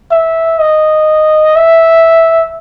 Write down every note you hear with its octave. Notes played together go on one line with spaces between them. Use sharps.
E5
D#5
E5